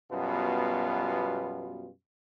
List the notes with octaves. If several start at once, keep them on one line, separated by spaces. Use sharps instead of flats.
F#2 B2 G3 B3 F4